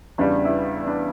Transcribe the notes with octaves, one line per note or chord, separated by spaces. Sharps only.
E2 C#3 G3 D4
E4
D4